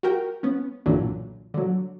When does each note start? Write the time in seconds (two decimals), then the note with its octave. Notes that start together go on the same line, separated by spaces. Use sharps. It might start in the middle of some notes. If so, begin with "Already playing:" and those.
0.03 F#4 G4 A#4 G5
0.43 B3 C#4
0.86 B1 G2 A#2 D3 E3 F#3
1.54 D3 F#3